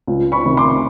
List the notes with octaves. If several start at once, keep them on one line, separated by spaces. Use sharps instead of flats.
C#2
B5 C#6
C3 D#3
C6 D6